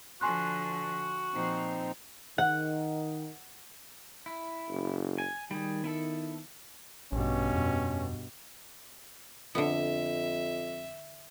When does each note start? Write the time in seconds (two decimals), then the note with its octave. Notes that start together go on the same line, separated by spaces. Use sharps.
0.21 D3 F3 F#4 G#5 C6 F#6
1.34 A#2 F3 C4 D#4
2.38 D#3 F#5
4.26 E4
4.69 F#1
5.18 G#5
5.51 D#3 G3 G#4
5.84 B3 E4 A4
7.12 A#1 G2 B2 C#4
7.54 F2
9.55 F2 D3 B3 E5